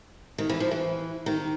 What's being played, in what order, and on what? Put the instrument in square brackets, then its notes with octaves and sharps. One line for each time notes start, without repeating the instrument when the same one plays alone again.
[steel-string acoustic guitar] D#3
E3
F3
E3
D#3